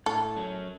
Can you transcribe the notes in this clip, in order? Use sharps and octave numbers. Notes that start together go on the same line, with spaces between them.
A2 A4
F#3 C#4